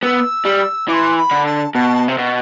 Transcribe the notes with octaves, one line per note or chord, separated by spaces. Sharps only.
B3 E6
G3
E3 C6 D6
B5
D3
A5
B2 A5
C3
B2